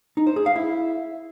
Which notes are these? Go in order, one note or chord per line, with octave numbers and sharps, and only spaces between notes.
D#4
C5
G#4
F5
E4